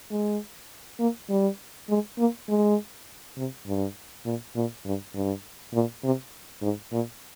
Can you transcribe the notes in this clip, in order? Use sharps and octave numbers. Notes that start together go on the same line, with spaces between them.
G#3
A#3
G3
G#3
A#3
G#3
C3
G2
A#2
A#2
G2
G2
A#2
C3
G#2
A#2